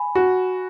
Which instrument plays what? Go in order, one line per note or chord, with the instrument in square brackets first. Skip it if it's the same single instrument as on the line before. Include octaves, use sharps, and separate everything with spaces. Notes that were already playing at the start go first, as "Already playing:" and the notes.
Already playing: [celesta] G#5 B5
[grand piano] F#4